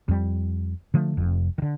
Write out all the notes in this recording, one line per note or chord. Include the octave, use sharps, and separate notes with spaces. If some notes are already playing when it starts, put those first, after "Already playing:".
F2 G3
D3 F3 A3
F1 F2
D3 D#3